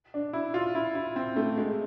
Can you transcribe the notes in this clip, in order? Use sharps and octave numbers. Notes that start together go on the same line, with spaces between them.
D4
E4
F4
E4
E4
C4
A3
G#3